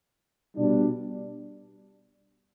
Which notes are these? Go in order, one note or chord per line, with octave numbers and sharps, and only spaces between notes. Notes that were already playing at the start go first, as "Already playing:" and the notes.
B2 G3 D4